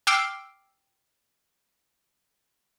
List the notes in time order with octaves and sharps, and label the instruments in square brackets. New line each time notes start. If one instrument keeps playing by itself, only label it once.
[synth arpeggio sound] G5 D6 E6 F6 C7 D7